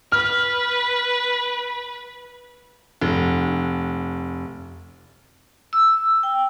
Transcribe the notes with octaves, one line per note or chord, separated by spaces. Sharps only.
B4 F6
F1
E6
G5